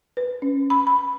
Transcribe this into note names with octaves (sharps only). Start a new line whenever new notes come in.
B4
C#4
B5
B5